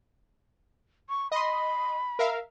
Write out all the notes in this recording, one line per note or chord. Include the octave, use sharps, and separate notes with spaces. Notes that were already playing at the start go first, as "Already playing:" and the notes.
C#6
D#5 B5 C6
A#4 E5 F5